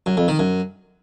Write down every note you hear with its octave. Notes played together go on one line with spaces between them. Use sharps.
F#2
F2
D#3
F#2